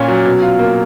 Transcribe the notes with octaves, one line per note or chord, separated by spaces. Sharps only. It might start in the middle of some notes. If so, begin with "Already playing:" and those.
Already playing: A#2 C#4
F#3
B2
F4
A#3